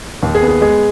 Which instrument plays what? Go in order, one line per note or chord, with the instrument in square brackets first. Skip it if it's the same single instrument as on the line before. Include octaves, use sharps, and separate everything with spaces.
[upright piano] D#2
G#4
B3
G#4
G#3 G#4